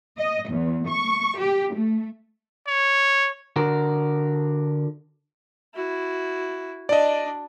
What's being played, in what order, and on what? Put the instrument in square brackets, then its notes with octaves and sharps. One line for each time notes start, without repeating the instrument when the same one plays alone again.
[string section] D#5
E2
C#6
G4
A3
[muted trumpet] C#5
[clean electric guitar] D3 F#4 A#4
[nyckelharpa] E4 F#4
[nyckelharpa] D4 [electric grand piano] D5 D#5